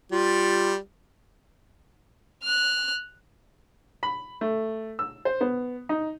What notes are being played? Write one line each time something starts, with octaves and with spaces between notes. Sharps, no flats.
G3 F4
F6 F#6
B5
A3
E6
C5
B3
D#4